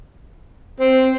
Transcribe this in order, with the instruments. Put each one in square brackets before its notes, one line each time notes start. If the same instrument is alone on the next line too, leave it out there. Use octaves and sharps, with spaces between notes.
[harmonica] C4